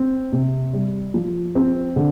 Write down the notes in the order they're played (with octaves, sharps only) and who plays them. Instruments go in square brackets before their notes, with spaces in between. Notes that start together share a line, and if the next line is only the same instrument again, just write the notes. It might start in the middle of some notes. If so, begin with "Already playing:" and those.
Already playing: [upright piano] C4
C3
G3
F3
C4
D3